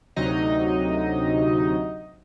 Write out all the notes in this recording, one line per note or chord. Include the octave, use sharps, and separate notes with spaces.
D2 C3 F#3 D#4 D#5